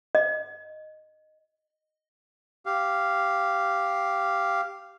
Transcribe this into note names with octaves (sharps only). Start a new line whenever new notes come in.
D#5
G4 F5